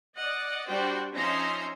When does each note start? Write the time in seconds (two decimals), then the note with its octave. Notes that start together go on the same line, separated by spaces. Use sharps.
0.17 D5 D#5 F#5
0.68 G3 D4 F#4 C5 G5
1.14 F3 C#4 D#4 E5 A#5 C6